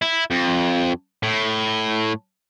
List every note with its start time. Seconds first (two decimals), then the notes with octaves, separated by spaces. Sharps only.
0.02 E4
0.31 F2
1.23 A2